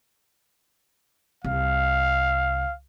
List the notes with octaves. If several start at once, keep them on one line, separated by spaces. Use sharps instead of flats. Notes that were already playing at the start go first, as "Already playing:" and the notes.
C2 F5